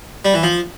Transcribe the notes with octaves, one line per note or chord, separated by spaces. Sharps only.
G3
E3
F3